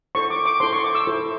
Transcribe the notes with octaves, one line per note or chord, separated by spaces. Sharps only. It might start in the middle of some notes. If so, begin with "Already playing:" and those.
E4 A4 C5 C#6
D6
D6
E4 A4 C5 C6
C#6
D6
E6
E4 A4 C5